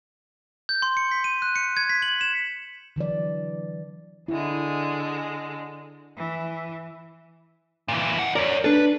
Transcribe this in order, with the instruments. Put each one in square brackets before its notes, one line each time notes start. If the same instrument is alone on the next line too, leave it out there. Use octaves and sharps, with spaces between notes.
[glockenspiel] G6
C6
C#7
B6
D#7
F#6
C#7
G#6
B6
F#7
E7
[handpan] D3 E3 F#3 D5
[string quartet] D3 G#3 [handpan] E4
[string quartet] E3
[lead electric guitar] A#2 E3
D#2 F#5
[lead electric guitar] A#4 C#5 [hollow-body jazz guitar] D5
[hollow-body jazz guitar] D4 A4 [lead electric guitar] B4